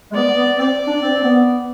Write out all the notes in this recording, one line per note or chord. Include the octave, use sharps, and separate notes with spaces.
G#3
B3 D5
B3
C4 D5
D4
C4
C4
B3